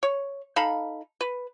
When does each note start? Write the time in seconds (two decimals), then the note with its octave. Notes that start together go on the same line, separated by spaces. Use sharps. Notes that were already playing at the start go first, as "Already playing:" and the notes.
0.03 C#5
0.56 D#4 A4 F5 B5
1.21 B4